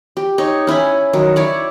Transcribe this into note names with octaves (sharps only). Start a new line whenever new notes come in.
G4
D#4 C#5
C#4 E4 G#5 B5
D#3 F#3
E4 C#5 D5